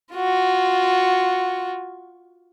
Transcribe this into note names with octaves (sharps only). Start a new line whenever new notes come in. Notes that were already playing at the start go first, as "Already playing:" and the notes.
F4 F#4